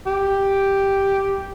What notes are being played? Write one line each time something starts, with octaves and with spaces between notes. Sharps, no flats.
G4